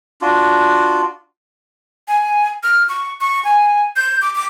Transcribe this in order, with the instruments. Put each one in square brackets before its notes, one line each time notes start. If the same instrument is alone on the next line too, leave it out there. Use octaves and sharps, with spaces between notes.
[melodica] D4 F4 F#4
[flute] G#5
F6
C#6
C#6
G#5
G6
D6
D6